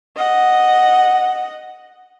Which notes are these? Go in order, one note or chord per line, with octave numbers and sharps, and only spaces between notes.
D#5 F#5